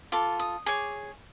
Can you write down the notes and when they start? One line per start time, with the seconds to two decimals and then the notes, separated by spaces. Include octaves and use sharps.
0.12 F4 A4 D6
0.39 D#6
0.66 G#4 C#5 D6